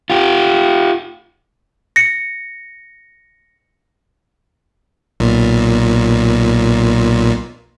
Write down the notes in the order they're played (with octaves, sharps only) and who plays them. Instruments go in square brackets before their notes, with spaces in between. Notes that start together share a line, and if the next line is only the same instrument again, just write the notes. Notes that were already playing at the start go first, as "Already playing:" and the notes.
[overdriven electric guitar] F4 G4
[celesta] A#6 C#7
[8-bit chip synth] B1 A#2